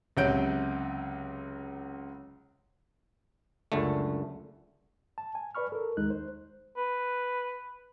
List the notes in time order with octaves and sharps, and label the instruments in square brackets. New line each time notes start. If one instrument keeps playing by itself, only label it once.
[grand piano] C#2 C3 F#3 F#5 G6 D7
[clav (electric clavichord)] C#2 F#2 D3 A3
[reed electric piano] A5
G#5
B4 D5 B5 C#6 F6
A4 A#4
D#2 G#3 D#4 F#6
C5
[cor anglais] B4